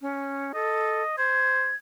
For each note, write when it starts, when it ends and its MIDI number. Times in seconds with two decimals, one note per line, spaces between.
0.01 0.52 61
0.54 1.03 69
0.54 1.16 75
1.18 1.70 72
1.18 1.76 92